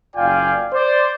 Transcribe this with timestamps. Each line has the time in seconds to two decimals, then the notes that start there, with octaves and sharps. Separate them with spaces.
0.16 F#1 F4 D5 F5 G5 G#5
0.73 C5 D5